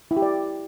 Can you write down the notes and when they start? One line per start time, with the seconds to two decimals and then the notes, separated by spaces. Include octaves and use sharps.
0.11 E4
0.17 G4
0.22 D5